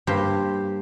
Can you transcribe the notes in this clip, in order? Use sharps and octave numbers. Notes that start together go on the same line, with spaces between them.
G2 A#3 G4 C5